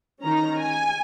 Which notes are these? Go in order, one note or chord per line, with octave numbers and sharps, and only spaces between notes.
D#3 C#4 A#5
G#5